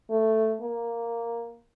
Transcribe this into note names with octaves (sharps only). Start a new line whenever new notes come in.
A3
A#3